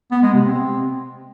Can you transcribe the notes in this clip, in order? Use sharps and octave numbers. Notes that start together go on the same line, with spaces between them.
B3
G#3
C3
C4